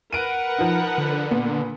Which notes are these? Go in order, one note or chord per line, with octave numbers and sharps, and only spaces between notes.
A#4 B4 F#5 D7 D#7
F3 D#4
D3
A#2 B3